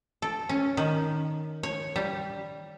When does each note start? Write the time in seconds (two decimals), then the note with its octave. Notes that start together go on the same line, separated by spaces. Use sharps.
0.22 A4
0.49 C#4
0.77 D#3
1.63 C#5
1.96 G3